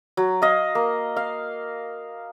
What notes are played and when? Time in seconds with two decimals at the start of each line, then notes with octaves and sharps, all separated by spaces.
0.17 F#3
0.42 D#5 F5
0.75 A#3
1.16 F5